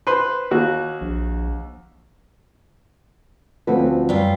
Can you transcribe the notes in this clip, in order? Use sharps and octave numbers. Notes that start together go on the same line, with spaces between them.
B4 C5 C6
D#2 F#4
A#1
D2 F3 C4 C#4 F#4 B4
F#2 G3 F4